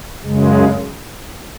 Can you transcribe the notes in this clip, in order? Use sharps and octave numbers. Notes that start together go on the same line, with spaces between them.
F#2 C#3 G#3